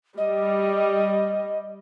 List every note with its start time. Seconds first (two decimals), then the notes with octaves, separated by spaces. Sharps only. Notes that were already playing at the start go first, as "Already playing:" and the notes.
0.17 G3 D#5